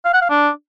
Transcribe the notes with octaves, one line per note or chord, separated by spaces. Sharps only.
F5
F#5
F5
D4